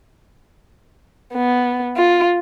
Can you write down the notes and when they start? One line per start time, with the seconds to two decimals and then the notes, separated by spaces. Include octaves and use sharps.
1.35 B3
1.97 F4